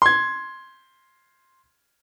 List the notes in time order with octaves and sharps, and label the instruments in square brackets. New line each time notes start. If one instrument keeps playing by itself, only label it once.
[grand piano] C6 G#6